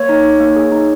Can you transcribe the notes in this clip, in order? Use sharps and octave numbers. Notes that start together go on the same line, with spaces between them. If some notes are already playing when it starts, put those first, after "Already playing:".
Already playing: A#3 C#5
D#4
D#4
A#3
G#4
D#4